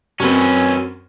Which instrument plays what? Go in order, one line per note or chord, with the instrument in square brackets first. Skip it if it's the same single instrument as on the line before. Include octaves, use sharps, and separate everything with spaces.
[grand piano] F#2 C4 [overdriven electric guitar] C#4 B4